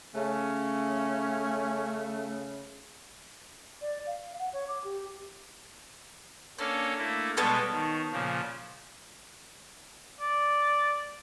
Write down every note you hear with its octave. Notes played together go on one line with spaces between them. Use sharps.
C#3 A3 C#4
D5
F5
F#5
C#5
D6
G4
A#3 C#4 D4 A4
A3 A#3 E4
B2 G3 G#3 B3 A4 C#5
D#3
A#2 C#3 F3
D5